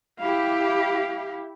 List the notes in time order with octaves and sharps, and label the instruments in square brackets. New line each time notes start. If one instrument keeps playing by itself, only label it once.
[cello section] E4 G4 [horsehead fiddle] F5